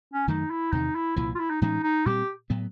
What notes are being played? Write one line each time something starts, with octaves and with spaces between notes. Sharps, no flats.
C#4
F#2 D#3 F#3 A3 D#4
E4
E2 C3 D#3 D#4
E4
C2 A#2 F3 E4
F4
E4
D#4
A2 E3 G#3 C#4 D#4
D#4
A#2 G3 C4 G4
A2 F#3 B3